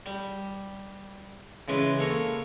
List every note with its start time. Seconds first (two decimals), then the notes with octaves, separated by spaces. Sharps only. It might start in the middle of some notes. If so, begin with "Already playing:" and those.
0.06 G3
1.68 C#3 E3 G#3 B4
1.99 A#3 A4 C#5